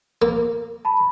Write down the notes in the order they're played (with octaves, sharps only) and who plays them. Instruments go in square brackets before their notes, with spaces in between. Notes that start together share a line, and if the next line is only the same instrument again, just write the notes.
[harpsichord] A#3
[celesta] A5 B5